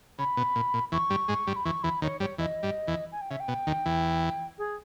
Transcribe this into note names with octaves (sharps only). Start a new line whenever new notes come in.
C#3 B5
B2
A#2
A#2
E2 E3 C#6
G2 G3
G#2 G#3
G2 G3
B5
E2 E3 C#6
E2 E3 B5
D#2 D#3 C#5
G2 G3 C#5
E2 E3 D#5
G2 G3
E2 E3
G#5
G5
C#3 E5
G5
B2
D#2 D#3
E2 E3
G#4